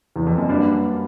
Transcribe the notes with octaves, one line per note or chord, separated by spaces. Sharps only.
E2
F2
F#2
G2 G3 A#3 D4 F#4 B4